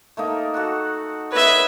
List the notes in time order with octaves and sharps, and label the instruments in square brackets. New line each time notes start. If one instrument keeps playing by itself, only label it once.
[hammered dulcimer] A3 A#3 D#4
F#4 A4 F#5
[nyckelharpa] B4 E5 [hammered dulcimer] C#5 D#5